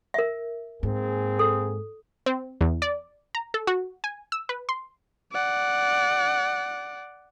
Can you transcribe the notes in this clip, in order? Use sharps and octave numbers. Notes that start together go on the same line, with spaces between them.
A#4 E5
G#2 A#3 C4 G#4
A4
C4
E2
D5
A#5
A4
F#4
G#5
E6
B4
C6
D5 F#5